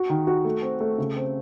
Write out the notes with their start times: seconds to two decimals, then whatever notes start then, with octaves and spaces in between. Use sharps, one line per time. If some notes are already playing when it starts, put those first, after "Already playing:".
Already playing: F#4
0.09 D#3
0.27 F#4
0.45 A3
0.62 C4
0.80 A3
0.98 C#3
1.16 C4